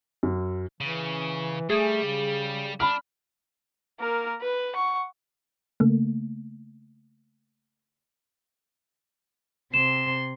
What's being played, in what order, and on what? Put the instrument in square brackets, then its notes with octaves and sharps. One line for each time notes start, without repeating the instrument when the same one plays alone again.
[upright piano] F#2
[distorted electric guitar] C#3 [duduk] E3
[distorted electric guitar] G3 [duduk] A3 [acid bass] G#4
[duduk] C#3
[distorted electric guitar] D4 [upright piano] B5 F6
[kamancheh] A#3 A#4
B4
F#5 C#6
[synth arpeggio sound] C#3 A3 A#3
[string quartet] C3 C6 [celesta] E7